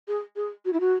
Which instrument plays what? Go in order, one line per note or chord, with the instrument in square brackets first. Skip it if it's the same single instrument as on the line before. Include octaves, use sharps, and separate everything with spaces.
[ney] G#4
G#4
F#4
E4
F#4